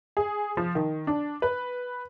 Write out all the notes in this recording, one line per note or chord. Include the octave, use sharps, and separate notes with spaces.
G#4
F3
D#3
D4
B4